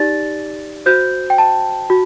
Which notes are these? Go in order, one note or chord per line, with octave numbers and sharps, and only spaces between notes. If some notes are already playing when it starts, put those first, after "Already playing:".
Already playing: D#4 G4 D5 A6
F#4 C5 G6
G5
A5
F#4